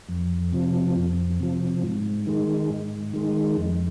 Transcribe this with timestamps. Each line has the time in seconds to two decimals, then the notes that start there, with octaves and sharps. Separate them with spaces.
0.09 F2
0.53 C3 F3
0.96 F2
1.40 C3 F3
1.82 G#2
2.27 D#3 G#3
2.70 G#2
3.14 D#3 G#3
3.57 F2